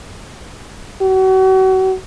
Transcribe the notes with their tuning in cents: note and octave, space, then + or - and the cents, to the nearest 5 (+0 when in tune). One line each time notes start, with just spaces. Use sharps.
F#4 +35